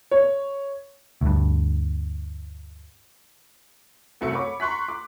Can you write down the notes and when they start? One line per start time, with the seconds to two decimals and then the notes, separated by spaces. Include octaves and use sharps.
0.11 C#5
1.21 D2 G2
4.21 C2 F#2 A3 C4 C#7
4.33 C#5 B5 D6
4.60 A#5 C6 C#6 F#6 B6
4.88 D6